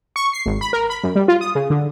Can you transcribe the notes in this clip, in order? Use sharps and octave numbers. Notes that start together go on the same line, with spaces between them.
C#6
C7
G#1
B5
A#4
B5
F#2
G3
F4
D#6
C#3
D3